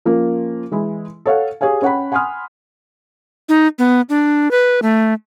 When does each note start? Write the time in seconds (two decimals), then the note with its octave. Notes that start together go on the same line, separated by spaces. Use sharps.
0.05 F3 A#3 C#4 F4
0.71 E3 G#3 E4
1.26 A4 C#5 F5 F#5
1.61 G4 G#4 C#5 F5 G#5
1.82 C#4 C#5 F#5 G5 B5
2.12 F#5 G#5 B5 C6 D#6 F6
3.49 D#4
3.79 B3
4.09 D4
4.51 B4
4.82 A3